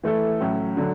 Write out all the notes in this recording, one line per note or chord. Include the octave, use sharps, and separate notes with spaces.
E3 A3 E4 A4
A2 F#3 C#4
D3 F#3